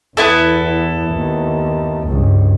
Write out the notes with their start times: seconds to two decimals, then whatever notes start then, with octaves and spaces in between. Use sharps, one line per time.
0.17 E2 B3 E4 A4
1.13 D#2
2.08 C#2 G2